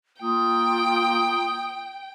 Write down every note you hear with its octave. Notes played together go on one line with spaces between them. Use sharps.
A#3 F4 G5 D#6